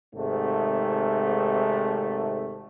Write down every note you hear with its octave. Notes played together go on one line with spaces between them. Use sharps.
G#1 G#2 C3 A3